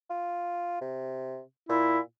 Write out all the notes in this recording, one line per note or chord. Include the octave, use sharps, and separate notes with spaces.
F4
C3
A#2 E4